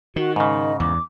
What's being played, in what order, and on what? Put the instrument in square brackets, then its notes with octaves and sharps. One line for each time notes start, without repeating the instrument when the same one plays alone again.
[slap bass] D#3 [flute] F#4
[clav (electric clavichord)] G#2 C#3 [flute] D#5
[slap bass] E2 [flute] D6